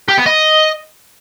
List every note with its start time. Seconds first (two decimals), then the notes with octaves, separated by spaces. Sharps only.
0.08 G4
0.17 B3
0.26 D#5